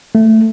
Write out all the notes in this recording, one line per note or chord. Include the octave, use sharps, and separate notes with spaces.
A3